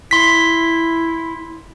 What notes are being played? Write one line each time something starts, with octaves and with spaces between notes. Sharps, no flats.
E4 C6 B6